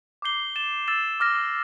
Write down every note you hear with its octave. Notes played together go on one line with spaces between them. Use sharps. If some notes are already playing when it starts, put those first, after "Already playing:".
D6 G6 C7 G7
A6 E7 G7
E6 A6 E7 G7
D6 F6 A#6